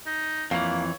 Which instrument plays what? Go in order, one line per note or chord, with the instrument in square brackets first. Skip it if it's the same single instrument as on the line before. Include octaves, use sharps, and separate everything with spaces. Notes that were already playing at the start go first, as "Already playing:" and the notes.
[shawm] D#4
[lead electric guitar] F2 E3 [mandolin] A#3 [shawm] C#5